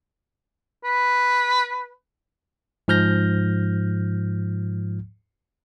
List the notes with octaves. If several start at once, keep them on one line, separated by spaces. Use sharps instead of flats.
B4
G#2 F3 F6 G6 A#6